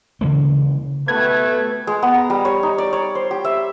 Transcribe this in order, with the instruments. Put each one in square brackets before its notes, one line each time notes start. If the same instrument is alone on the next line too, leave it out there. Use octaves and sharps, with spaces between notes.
[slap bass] C#3 E3 G#3 A#3
[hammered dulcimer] B2 F#4 G4 [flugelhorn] A3 [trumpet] B4 [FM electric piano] G#6
[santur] G#3
B3
A#5
G3
C#5
D#4
D5
C#5
C5
G4
E5